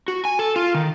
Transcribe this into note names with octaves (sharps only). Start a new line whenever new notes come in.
F#4
G#5
A4
F4
D#3